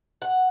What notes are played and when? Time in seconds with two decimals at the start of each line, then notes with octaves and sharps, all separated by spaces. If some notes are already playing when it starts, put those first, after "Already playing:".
0.22 F#5